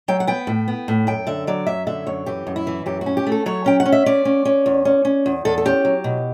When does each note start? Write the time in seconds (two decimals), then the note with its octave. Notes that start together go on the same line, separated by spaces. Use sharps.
0.08 F#3 G5
0.20 F#5
0.27 B3 G5
0.47 A2
0.68 B3
0.88 A2
1.07 F#2 G5
1.27 D3 E5
1.47 F#3 D5
1.67 F#2 E5
1.87 D3 E5
2.07 F#2 C#5
2.26 E3 G4
2.47 F#2
2.56 E4
2.67 E3
2.86 F#2 G4
3.01 F#4
3.06 C#4
3.17 G4
3.27 A3
3.32 A4
3.46 F#3 C#5
3.66 C#4 G5
3.80 F#5
3.86 C#4
3.92 E5
4.06 C#4 D5
4.25 C#4
4.45 C#4
4.66 E2
4.85 C#4
5.05 C#4
5.26 E2
5.45 E2 A4
5.58 A4
5.65 C#4 G4
5.85 F#3
6.04 B2